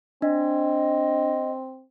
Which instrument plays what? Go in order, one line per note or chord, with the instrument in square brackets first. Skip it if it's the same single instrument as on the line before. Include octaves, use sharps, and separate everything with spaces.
[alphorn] C4 [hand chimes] D4 [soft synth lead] D#5